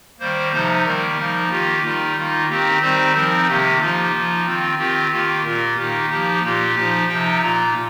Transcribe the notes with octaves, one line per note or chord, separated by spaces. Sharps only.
D#3 G3 A#3 C5
C3 F3 D#4 C5
D#3 G3 A#3 A#4
F3 A#3 D#4
D#3 A#3 F4 G4
D#3 G3 D#4 F4
D#3 A#3 D#4
D#3 C4 D#4 G4
D#3 G3 C4 D#4 C5
F3 C4 D#4 A#4
C3 D#3 A#3 G4
F3 A#3 D#4 F4
F3 A#3 D#4
D#3 C4 F4
D#3 C4 F4 G4
D#3 A#3 F4 G4
A#2 A#3 F4 A#4
D#3 A#3 D#4 G4
F3 A#3 D#4 G4
A#2 A#3 F4 G4
F3 D#4 G4
C3 F3 D#4 G5
A#2 A#3 F4 A#5